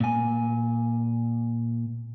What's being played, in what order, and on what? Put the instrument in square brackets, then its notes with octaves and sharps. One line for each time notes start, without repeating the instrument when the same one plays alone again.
[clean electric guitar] A#2 G#5